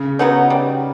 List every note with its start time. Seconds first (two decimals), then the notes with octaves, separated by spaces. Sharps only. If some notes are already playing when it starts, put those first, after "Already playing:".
Already playing: C#3
0.19 F#3 B3 D#4
0.50 G3